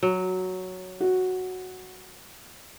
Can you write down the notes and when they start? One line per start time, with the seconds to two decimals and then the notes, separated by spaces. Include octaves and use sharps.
0.03 F#3
1.00 F#4